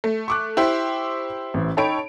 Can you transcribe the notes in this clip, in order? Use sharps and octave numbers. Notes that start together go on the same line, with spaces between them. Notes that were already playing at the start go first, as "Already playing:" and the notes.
A3
C#6 D6 F#6
E4 G4 C5
A1
D#4 A4 C#5 G5 B5 D7